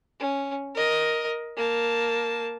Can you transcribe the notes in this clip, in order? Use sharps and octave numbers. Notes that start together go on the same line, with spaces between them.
C#4
A#4 D#5
A#3 A5